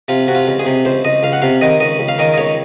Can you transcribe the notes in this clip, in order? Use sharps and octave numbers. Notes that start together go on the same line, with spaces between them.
C3 F4
C3 F#4
F4
C#2
G#4
C3
C#2 C5
C#2 D#5
C#2 F5
F#5
C3 F5
D#3 D#5
C#2 D#5
C#2
F5
D#3 D#5
D#5
C#2 C#5